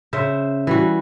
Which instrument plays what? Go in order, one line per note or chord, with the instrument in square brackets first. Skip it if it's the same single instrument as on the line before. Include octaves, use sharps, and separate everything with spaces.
[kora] C#3 C5 E5
E3 G3 F#4